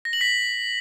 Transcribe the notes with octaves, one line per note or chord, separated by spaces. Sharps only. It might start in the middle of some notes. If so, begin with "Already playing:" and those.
A#6
F#7
B6